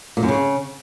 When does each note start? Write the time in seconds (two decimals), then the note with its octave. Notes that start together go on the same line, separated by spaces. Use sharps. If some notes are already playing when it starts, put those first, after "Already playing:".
0.17 A#2
0.23 F#2
0.28 C#3